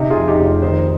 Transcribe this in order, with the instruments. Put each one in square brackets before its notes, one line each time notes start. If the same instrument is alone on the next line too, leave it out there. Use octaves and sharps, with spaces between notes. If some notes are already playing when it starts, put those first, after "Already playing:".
Already playing: [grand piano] C3 D#4 G4
F4 G#4
F2
D#4 G4
F1
F4
D#3 C5 D#5